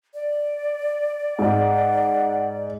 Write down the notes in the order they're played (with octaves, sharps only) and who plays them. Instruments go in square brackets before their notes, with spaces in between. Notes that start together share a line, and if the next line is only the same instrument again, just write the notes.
[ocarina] D5
[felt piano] G#2 [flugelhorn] F#5